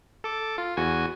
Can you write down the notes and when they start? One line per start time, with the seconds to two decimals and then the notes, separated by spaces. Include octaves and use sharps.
0.24 A4 D6
0.58 F4
0.77 E2 F#4 G#5